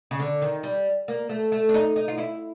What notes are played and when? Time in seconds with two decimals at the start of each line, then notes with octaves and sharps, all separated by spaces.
0.11 C#3
0.20 D3
0.42 D#3
0.63 G3
1.08 A#3
1.29 A3
1.52 A3
1.69 D4
1.74 D#4
1.96 D#4
2.08 F4
2.18 E4